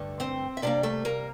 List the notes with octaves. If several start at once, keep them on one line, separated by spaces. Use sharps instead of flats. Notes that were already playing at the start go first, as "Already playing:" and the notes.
Already playing: G2 D3 A3
C4 C5
E5
C3 G3 A#3 D4 D5
A3 A4
A#3 A#4